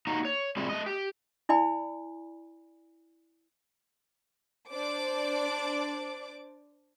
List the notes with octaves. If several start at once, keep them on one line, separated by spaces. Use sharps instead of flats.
A#3 D#4 F#4 D#5 A#5
C#5
G3 C4 E4 F4 G#4
A3 D#5
G4
E4 D5 G#5 B5
D4 C5 D5 D6